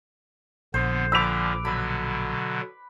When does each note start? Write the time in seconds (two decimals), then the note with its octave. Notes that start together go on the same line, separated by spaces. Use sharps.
0.74 A#1 D3 B3 C5
1.12 A#2 D3 F3 B4 D6 E6 B6 F7
1.65 B2 D3 F#3 B5